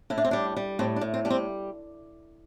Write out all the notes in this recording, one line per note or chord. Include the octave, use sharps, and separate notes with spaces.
A2 E4
D4
C4
G3 D4
G3
A2 C4
D4
A2
C4
G3 D4
C4